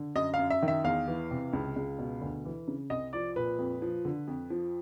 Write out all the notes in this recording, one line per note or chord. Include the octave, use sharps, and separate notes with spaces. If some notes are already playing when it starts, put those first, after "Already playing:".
Already playing: D3
F#2 D#5
F5
F#2
E5
D#3
E5
E2 F5
E3
C3
C#2
C#2
B2
D2
E3
C#3
C2 D#5
F3 D5
A#2 B4
F2
F3
D3
F2
F3